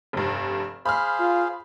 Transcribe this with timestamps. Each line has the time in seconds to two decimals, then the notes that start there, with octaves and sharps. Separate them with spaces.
0.13 F1 G2
0.85 G#4 C5 F5 B5 F6
1.20 F4